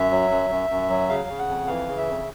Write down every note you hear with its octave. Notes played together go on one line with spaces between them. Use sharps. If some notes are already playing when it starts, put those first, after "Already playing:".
Already playing: F#2 E5
F#3
F#2
F#2
F#2
F#3
C#3 F5
C#3
F#5
F2
E3 F5
C#3
E5
F2